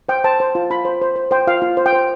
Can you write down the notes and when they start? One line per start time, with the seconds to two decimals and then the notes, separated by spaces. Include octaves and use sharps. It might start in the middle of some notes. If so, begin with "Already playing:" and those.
0.09 C5 G5
0.24 C5 A5
0.40 C5
0.55 F4
0.70 F4 B5
0.85 C5
1.02 C5
1.16 C5
1.31 C5 G5
1.47 F4 F5
1.62 F4
1.77 C5
1.86 G5
1.93 C5